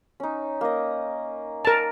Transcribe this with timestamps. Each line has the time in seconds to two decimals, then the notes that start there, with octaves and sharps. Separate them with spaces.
0.20 C#4 D#4
0.61 A#3 D#5
1.65 A#4 A5